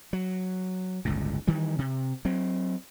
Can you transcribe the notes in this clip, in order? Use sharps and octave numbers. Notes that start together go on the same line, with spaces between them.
F#3
G1 C#2 A2
D#3 E3 G3
C3
F#3 C4